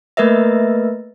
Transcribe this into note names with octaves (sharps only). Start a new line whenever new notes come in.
A3 A#3 A#4 B4 D#5 E5